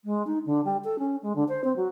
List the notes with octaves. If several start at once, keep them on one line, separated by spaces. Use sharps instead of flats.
G#3
D#4
D3
G3
A4
C#4
G#3
D3
C5
C4
F#3